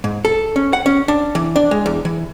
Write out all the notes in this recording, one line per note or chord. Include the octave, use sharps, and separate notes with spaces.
G#2
A4
C#4
F#5
C#4
D4
E3
D4
G#3
E2
E3